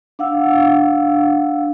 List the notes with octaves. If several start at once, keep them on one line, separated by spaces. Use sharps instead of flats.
D4 F5 F#5 E6